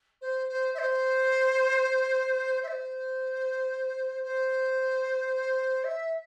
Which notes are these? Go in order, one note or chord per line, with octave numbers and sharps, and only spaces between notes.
C5
C5
E5
C5
E5
C5
C5
E5